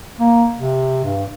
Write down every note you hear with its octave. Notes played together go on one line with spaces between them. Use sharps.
A#3
C3
G2